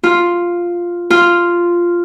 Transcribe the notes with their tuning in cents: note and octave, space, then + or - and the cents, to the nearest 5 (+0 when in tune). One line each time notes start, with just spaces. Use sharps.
F4 +0
F4 -5